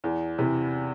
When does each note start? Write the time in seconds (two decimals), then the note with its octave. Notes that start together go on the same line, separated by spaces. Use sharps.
0.04 E2
0.38 C3 E3